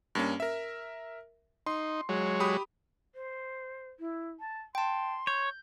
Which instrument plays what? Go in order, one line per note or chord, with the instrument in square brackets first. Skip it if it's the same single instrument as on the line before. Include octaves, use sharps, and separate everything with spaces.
[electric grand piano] G2 A#3 C#4
A#4 E5
[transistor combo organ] D#4 [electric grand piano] C6
[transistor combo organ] F#3 G#3 C#5
[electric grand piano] G4 B5 D#6
[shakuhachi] C5
E4
A5
[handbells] G5 A5 [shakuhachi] C6
[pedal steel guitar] C#5 [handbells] G6